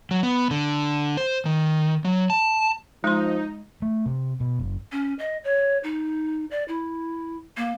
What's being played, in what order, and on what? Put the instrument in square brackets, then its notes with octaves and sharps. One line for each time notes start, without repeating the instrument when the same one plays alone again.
[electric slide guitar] F#3
B3
D3
C5
D#3
F#3
A5
[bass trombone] F3 [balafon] G#3 C6 [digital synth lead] D#4
[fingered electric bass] A3
C3
B2
F#1
[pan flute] C#4
D#5
C#5
D#4
D5
E4
A#3